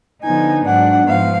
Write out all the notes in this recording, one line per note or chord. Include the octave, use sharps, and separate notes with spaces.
D3 F3 B3 D#4 G#5
G#2 F#3 D4 F#5
G#2 F3 B3 F5